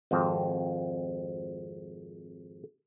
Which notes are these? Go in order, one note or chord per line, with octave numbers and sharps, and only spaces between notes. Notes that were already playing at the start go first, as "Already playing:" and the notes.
G#1 F2 C4